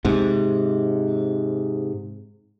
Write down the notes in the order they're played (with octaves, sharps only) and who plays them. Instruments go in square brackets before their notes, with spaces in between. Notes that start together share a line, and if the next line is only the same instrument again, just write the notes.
[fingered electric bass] G#2 C3